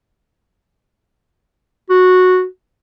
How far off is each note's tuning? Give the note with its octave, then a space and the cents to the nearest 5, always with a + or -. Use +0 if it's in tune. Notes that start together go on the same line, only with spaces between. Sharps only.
F#4 -10